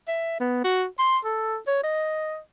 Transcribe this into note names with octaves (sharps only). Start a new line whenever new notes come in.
E5
B3
F#4
C6
A4
C#5
D#5